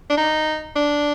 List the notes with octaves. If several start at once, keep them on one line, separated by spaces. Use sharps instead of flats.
D4
D#4
D4